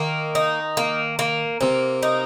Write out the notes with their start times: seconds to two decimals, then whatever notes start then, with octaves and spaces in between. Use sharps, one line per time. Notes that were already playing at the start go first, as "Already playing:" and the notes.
Already playing: D#3 A#3
0.35 D#4
0.77 A#3
1.19 A#3
1.61 C3 A#3
2.03 D#4